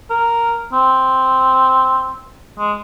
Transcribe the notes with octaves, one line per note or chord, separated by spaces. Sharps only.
A#4
C4
G#3